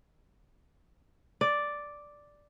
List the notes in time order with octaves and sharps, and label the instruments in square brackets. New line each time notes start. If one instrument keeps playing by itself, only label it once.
[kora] D5